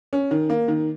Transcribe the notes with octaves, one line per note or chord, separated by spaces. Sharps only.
C#4
D#3
A#3
D#3